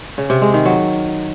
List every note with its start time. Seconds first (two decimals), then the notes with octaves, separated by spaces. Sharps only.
0.18 C#3
0.30 C3
0.42 G#3
0.54 D#3
0.65 F#3